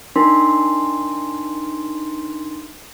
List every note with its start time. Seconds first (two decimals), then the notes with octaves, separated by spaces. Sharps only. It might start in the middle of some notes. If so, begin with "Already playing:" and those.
0.16 D4 D#4 A#4 C6